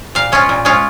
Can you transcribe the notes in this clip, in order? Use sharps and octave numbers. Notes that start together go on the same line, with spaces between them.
A#2 F5
G#3 C#4 F4
A#2
G#3 C#4 F4